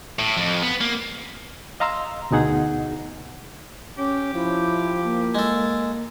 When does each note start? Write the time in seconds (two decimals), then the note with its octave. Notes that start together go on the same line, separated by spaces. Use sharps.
0.19 A2
0.37 F2
0.62 B3
0.81 A#3
1.80 D#5 F5 A#5 C6 E6
2.31 D2 B2 D#4 G#4 F#5
3.98 C#4 G4
4.34 F3 E4
5.04 A#3
5.35 G#3 A4